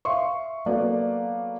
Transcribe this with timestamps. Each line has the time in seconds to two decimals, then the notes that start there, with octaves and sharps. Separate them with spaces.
0.05 E5 F5 C6 C#6
0.66 F#3 A#3 B3 A4 B4 D5